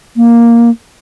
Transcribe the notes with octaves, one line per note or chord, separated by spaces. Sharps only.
A#3